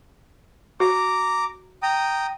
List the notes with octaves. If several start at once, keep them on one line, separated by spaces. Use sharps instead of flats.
F#4 A#5 D6
G5 A#5 D#6